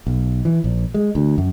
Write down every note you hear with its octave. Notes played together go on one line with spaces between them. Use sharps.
B1
E3
A#1
G#3
D2
F#2